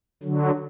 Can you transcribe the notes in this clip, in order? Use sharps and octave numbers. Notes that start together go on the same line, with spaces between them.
D3 F#3